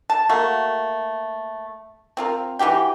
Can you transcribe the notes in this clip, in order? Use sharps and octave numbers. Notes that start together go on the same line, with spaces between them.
A5
A3 A#3 F#4
C4 F4 A#4
E3 F#4 G4 G5